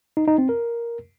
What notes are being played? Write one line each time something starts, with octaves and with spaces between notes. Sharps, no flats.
D#4
D#4
C4
A#4